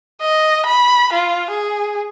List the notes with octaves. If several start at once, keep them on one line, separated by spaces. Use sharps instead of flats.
D#5
B5
F4
G#4